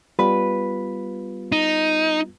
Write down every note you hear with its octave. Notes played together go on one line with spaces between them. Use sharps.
G3 B3 F4 B4
D#4